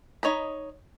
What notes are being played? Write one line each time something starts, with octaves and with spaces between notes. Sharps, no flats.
D#4 C#5 D#5 B5